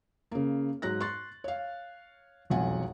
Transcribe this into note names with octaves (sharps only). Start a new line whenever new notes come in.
C#3 A#3
G#2 F#3 F#6 A#6
C6 C#6 F#6 A6
C#5 F5
E1 B1 F2 F#5 G#5